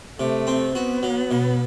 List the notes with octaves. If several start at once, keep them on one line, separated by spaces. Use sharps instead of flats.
C3 A3
C4
B3 F#4
F#3
B2